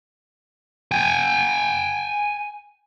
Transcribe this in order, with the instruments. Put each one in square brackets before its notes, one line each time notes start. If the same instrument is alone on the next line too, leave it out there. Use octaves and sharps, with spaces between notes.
[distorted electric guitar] G5 G#5